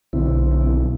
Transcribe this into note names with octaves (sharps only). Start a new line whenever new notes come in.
B1 D3 C4 E4